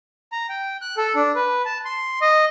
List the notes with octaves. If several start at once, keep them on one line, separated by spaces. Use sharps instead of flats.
A#5
G5
F#6
A4
D4
B4
A5
C6
D#5